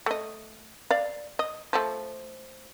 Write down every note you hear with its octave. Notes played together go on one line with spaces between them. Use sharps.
A3 D#5
D5 F5
D#5
F3 A3